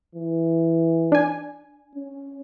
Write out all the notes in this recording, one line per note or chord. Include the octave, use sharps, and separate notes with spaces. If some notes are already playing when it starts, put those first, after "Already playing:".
E3
D4 G#5
C#4